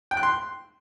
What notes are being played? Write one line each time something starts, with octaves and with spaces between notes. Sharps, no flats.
G5
F#6
C6